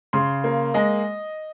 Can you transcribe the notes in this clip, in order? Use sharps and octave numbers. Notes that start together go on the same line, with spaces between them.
C#3 C6
A#3
G#3 D#5